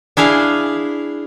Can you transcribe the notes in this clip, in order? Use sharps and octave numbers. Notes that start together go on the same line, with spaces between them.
D4 E4 G#4 F5